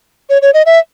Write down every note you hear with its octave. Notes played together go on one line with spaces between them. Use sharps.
C#5
C#5
D#5
E5